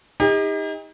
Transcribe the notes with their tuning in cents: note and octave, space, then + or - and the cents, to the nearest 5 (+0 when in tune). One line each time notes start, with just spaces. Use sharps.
D#4 +25 G4 +45